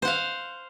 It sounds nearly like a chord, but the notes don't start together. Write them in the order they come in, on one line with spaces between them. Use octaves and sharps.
C5 F#5 F5